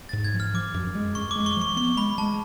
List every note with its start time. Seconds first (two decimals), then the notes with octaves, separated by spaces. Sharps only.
0.09 A6
0.13 G#2
0.24 G#6
0.34 F3
0.40 F6
0.54 F3 D6
0.74 F#2
0.95 G#3
1.15 F#2 C#6
1.31 D6
1.36 G#3
1.46 C#6
1.57 F3 C#6
1.76 B3 C#6
1.97 G#3 B5
2.18 G#3 A5